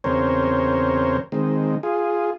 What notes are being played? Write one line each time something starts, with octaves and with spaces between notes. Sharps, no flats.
E2 C#3 C4 A#4 C5 C#5
D#3 G#3 C4
F4 G#4